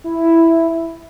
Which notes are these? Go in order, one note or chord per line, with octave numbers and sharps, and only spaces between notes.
E4